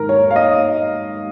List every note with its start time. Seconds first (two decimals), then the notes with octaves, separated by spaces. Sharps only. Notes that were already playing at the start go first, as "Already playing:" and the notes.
Already playing: G#2 D#3 A#4
0.09 C#5
0.31 F5
0.36 D#5